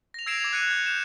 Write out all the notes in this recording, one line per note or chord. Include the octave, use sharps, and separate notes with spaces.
A#6 F7
E6 G#6 C7 D7 E7 F7
D6 F7
F#6 G#6 C#7 D#7
G6
G6 E7 F7